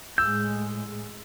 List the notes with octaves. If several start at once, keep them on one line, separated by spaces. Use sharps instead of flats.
A2 G#3 E6 G6